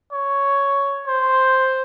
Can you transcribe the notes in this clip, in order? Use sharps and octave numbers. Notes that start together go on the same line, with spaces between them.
C#5
C5